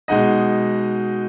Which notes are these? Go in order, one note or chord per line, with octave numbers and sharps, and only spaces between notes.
B2 G#3 D#4 D#5 F#5